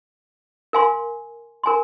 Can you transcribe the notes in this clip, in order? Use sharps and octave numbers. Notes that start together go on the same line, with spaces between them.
A#4 F5 G#5 C6
A#4 G#5 C6